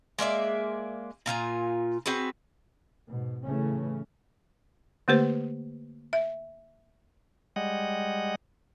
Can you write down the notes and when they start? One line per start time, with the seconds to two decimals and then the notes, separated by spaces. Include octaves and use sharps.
0.19 G#3 A#3 D5 E5
1.26 A#2 F4 G#5 A#5
2.06 C4 F#4 G#4 B4
3.08 G#2 B2
3.45 A2 C#3 E3 A3 C#4
5.08 D3 A3 A#3 G4 B4 C5
6.13 E5
7.56 G3 G#3 D#5 F#5